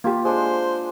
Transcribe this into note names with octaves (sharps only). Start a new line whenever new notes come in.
A#3 F4 G4
G#3 D4 C5